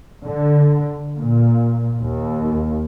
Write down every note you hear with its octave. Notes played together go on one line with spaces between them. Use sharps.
D3
A#2
D#2